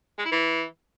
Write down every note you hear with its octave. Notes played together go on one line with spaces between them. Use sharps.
G#3
E4
E3